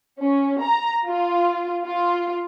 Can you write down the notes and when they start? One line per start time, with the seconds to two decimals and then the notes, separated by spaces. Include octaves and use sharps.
0.20 C#4
0.61 A#5
1.07 F4
1.84 F4